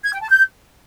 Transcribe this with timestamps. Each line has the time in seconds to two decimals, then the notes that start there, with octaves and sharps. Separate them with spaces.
0.03 G#6
0.12 G5
0.20 A5
0.29 G6